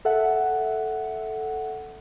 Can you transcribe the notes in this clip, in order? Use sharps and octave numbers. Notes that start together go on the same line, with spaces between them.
A4 E5 F#5